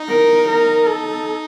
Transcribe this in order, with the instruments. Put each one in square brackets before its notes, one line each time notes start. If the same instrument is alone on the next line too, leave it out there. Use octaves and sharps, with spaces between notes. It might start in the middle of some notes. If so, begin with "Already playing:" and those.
Already playing: [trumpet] D#4
[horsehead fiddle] A#4
A#4
A4